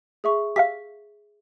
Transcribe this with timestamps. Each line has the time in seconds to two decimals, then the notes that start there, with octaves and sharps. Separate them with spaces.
0.24 G#4 E5 C#6
0.56 G4 E5 F5 B6